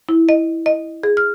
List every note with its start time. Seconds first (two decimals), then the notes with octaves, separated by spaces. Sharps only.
0.09 E4
0.29 D#5
0.66 D#5
1.03 G#4
1.17 F6